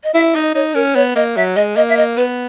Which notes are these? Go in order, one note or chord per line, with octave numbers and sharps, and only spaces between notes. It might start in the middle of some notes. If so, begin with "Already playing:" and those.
D#5
E4 E5
D#4 D#5
D#4 C#5
C#4 A#4
B3 C#5
A#3 D#5
F#3 E5
G#3 D#5
A#3 D#5
E5
D#5
B3 B4